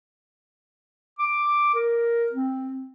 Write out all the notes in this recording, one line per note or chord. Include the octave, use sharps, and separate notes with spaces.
D6
A#4
C4